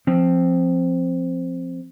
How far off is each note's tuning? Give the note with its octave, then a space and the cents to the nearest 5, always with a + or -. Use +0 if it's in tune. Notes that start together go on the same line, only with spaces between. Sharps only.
F3 +0 C4 +0